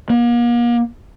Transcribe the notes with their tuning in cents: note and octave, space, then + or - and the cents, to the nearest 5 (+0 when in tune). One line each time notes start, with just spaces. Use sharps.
A#3 +40